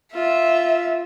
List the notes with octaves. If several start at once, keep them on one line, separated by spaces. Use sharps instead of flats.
F4 E5